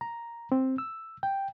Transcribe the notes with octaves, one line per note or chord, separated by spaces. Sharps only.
A#5
C4
E6
G5